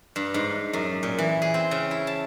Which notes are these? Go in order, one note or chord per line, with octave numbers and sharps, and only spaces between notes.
G2
G#2
F#2
A#2
E3
G#4
C4
C#3
E4
A5